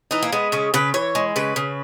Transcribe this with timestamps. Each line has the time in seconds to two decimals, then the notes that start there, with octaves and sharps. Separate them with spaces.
0.11 E3 D#4
0.23 A#3
0.32 G#3 B3
0.52 C#3 C#4
0.74 C#3 B4
0.94 E3 C#5
1.15 G#3
1.36 C#3 B4
1.56 C#3